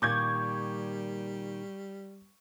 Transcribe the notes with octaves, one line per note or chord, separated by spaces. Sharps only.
A#2 D#3 G3 C#6 D6 G6 G#6